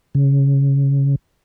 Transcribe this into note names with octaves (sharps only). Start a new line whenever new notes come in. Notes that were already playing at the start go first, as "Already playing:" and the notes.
C#3